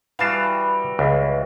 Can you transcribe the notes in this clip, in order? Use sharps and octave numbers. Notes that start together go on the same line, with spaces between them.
E3 G3 F#4 F5 A5
C#2